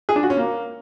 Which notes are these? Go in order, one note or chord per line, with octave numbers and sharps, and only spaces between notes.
G#4
D4
F#4
C#4
A#3